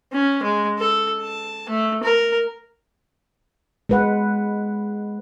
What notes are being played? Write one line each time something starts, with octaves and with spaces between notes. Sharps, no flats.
C#4
G#3
A4
A5
A3
A#4
G#3 B4 F#5